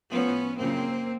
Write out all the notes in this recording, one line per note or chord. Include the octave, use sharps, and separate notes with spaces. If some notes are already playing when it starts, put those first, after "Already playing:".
A2 F3 B3 C#4
F#2 C#3 F3 A#3 C4